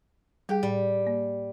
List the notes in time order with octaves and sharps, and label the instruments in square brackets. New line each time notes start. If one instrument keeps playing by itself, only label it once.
[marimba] G3 G#4 G5 [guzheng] G4
[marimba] A2 [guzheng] G3
[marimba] A#3